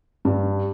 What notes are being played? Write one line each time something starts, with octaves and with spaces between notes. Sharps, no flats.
G2